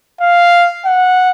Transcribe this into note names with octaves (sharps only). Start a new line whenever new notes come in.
F5
F#5